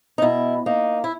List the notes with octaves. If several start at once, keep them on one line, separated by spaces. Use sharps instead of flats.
D#4
B2 E4
A#3 D#4
E4